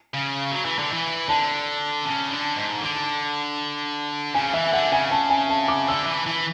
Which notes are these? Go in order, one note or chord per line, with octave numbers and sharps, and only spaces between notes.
C#3
F#3
E3
D3
E3
D3 A5
C#3
D3
G#2
D3
C#3 G#5
E3 E5
D3 F#5
C#3 G#5
A5
G#5
A5
D6
D3 E6
E3
E3